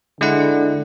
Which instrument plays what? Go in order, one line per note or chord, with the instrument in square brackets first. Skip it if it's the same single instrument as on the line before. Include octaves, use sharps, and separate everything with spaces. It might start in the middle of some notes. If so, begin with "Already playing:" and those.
[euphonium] D3 [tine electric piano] G#3 E4 F#5